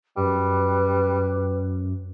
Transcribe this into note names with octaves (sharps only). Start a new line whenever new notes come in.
F#2 G3 B4